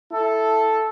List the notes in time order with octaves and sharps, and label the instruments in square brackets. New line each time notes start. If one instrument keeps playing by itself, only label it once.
[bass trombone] E4 [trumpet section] A4